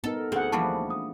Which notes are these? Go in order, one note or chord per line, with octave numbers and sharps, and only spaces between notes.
B3 D#4 A4 A#4
D2 C4 G#4 F#5
E3 F3 G3 A#3 A5 C#6
D#6